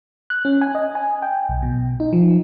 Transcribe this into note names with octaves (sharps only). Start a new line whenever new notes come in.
F#6
C#4
G#5
D#5
G#5
G5
B1
B2
D#4
F3